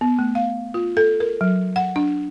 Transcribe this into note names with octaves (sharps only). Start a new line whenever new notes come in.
B3
A3
F5
F4
A4
A#4
F#3
F#5
D4